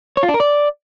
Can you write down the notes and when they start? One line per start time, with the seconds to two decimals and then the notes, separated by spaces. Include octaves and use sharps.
0.17 C#5
0.23 F4
0.29 D4
0.34 A#4
0.40 D5